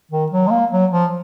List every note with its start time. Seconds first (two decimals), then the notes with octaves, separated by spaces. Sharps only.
0.11 D#3
0.31 F#3
0.47 G#3
0.51 A#3
0.71 F#3
0.92 F3